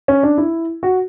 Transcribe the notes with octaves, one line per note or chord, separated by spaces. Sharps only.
C#4
D4
E4
F#4